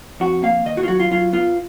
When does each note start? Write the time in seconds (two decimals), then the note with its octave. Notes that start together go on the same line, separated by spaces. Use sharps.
0.20 F2 F#4
0.43 A#3 F5
0.65 D#3 D#5
0.77 F#4
0.83 F4
0.88 F#3 F#4
1.00 F4
1.11 F#3 F4
1.33 B3 F4